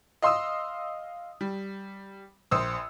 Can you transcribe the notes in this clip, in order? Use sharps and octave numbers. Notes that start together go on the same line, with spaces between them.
D#5 F5 C6 D#6 E6
G3
A#1 C5 D#6 E6